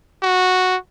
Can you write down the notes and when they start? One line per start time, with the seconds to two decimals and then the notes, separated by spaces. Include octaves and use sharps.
0.23 F#4